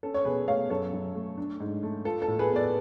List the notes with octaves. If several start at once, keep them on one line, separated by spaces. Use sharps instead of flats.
C#4 A4
C#5
B2 G#4 B4
A3 C#5 F5
F#2 A4 C#5
F#2
A3
D4
G#2
A3
F4 A4
A4
A2
G#4 B4
B3
B4 D5